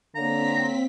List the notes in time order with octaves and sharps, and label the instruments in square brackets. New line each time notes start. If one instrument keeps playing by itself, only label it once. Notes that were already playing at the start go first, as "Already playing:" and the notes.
[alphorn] D3 [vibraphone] A#3 C#5 F5 [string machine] C4 B6 [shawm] A#5